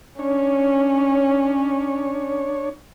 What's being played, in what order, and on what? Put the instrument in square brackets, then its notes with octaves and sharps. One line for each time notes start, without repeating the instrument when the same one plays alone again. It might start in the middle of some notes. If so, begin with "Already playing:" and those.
[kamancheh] C#4 [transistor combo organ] D4 C#5